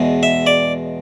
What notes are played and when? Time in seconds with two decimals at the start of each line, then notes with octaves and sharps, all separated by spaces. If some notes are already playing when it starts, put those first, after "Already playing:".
Already playing: E2 B2 G#3
0.23 E5
0.47 D5